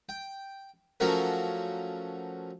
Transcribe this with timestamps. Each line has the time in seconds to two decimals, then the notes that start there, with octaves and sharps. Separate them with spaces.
0.09 G5
1.00 F3 F#3 A3 C#4 F#4 A#4